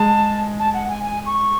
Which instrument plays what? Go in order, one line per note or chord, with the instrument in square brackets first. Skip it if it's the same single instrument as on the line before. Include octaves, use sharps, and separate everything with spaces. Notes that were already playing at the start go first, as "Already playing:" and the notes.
Already playing: [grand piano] G#3 [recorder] A5
[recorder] A5
F#5
G#5
G#5
C#6